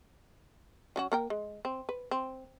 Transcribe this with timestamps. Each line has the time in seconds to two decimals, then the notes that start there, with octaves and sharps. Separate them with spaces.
0.96 F#3 C#4 F#4
1.12 A#3 A#4 G5
1.30 G#3
1.65 C4
1.89 B4
2.11 C4